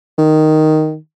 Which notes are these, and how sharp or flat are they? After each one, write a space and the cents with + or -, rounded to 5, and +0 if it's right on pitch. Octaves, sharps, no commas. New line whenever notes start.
D#3 +0